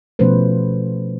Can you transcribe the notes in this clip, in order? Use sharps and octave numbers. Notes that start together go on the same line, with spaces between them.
B2 F3 A3 C#4 B4 C5